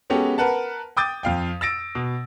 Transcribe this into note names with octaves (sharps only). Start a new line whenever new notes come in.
G#3 B3 C#4 F#4 G4 A4
A#4 B4 F#5 A5
G5 D6 D#6 G6 A6
F2 F5 G5
E6 A6 A#6 D7
B2